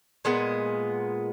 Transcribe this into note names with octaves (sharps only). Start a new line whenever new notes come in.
A#2 G#3 B3